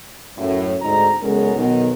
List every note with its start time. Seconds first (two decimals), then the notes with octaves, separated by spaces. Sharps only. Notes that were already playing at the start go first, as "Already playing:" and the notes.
0.38 F#2 A2
0.81 D2 G#2 C4 D#4 A#5
1.21 F#1 G#3 B3 C#4 A4 A#4
1.55 B1 B2 D#3